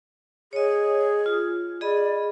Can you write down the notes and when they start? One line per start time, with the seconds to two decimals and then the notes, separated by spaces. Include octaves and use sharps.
0.53 G#4 C#5 D#5
1.26 F4
1.81 G#4 D5 D#5 B5